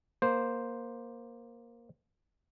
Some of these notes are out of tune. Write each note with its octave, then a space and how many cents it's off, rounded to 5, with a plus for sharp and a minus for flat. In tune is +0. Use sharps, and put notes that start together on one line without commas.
A#3 +10 C5 +0